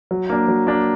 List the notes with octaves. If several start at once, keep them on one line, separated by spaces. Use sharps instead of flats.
F#3
A#3 D4
F#3
A#3 D4